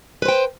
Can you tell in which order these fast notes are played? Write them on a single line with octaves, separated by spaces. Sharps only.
B4 C5 G5